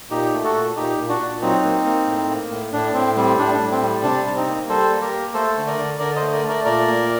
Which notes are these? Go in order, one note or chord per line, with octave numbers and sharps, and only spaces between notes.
A#2 D#4 G4
A3
F#4 A4
A#2
A#2 D#4 G4
A#2
D4 F#4
A#2
F#3 C4 D#4
A#3
A#3
A2
A#3
A2
A2 D4
A2 C4
G3 C4
A2 D4
D4
A2
C4
G3
C3 D4
C3
C4 D#4
A#3
G3 A4 C5
A#3
G4 A#4
A#3
A3 A4 C5
D3
A#4 D5
D3
D3 A#4 D5
C5 D#5
A3
A#4 D5
A3
A#4 D5
A#2 A#4 D5
A#3